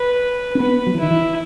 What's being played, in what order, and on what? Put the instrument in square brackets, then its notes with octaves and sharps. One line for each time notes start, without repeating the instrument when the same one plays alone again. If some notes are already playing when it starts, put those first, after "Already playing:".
Already playing: [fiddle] B4
[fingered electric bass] C#4
[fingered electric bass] B3 [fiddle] B4
[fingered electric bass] F#3
E3
[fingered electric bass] D#3 [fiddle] E4
[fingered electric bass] E3